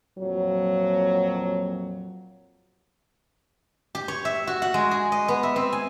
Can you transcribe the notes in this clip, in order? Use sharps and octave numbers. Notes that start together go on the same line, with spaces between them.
F2 A#2 F#3
G4
C#5
E5
F#4
F#5
G#3
G#4
D#5
B3
E5
C4
G#5